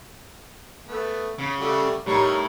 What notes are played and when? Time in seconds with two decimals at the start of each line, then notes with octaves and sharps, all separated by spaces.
0.87 A3 B3
1.39 C#3
1.59 G3 A3 F#4
2.06 A2 G3 D#4 A#4 C#5